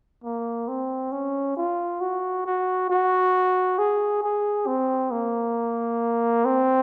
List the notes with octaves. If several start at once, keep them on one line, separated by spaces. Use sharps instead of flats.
A#3
C4
C#4
F4
F#4
F#4
F#4
G#4
G#4
C4
A#3
C4